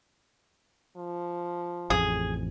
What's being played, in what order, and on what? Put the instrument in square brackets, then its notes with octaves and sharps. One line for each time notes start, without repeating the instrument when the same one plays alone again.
[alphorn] F3
[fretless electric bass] A1 F2 [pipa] G#4